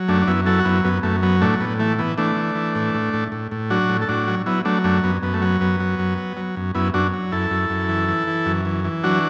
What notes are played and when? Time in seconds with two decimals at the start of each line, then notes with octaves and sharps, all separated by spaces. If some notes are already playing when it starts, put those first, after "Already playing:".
Already playing: F#3
0.08 F#2 A3 D4
0.22 D4
0.27 F#2 B3 E4
0.46 F#3 E4 A4
0.60 F#4
0.65 F#2 B3 E4
0.85 F#2 B3
1.03 F#2 A3
1.23 F#3 B3
1.41 A2 A3 D4
1.60 A2 B3
1.80 E3 A3
1.99 E3 B3
2.18 E3 A3 D4
2.36 E3
2.56 E3
2.75 A2
2.94 A2
3.13 A2
3.32 A2
3.51 A2
3.70 F#3 D4 F#4
3.89 A2
4.02 A4
4.08 A2 D4 F#4
4.27 F#3
4.46 F#3 B3 E4
4.65 F#3 A3 D4
4.84 F#2 A3 D4
5.04 F#2 B3
5.23 F#2 B3
5.33 A3
5.42 F#3 B3
5.61 F#2 B3
5.80 F#3
5.99 F#2
6.18 F#3
6.37 F#3
6.57 F#2
6.75 F#2 B3 E4
6.94 F#2 D4 F#4
7.13 F#3
7.32 F#2 E4 A4
7.51 F#2
7.70 F#2
7.89 E3
8.09 E3
8.28 E3
8.46 F#2
8.65 E3
8.84 E3
9.04 F#3 D4 F#4